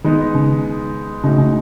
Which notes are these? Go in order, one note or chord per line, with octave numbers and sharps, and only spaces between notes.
D#3 G#3 B3 D#4
C#3
A2 C#3 G#3 D#4 F#4
C#3